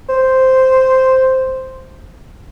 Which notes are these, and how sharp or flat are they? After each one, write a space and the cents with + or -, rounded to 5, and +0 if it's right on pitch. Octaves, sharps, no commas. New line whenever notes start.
C5 -5